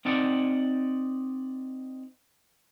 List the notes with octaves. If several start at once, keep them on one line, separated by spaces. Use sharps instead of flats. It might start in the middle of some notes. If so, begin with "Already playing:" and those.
C4 D#4 D5 F#5